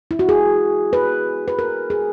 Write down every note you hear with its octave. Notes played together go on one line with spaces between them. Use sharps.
E4
F#4
G#4
B4
B4
A#4
G#4